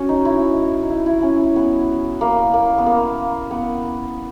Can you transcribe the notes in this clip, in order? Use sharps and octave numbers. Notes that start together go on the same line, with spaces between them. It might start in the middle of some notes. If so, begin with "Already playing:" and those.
Already playing: C#4 F#4
D#4
E4
D#4
E4
E4
C#4
B3
A#3
A#3
B3
A#3
B3